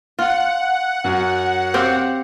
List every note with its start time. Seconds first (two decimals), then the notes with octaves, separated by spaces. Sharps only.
0.19 F4 F#5
1.04 F#2
1.74 C4 G4 F5